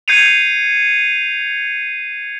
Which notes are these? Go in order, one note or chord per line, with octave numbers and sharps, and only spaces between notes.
G6 G#6 C7 C#7 D#7 F7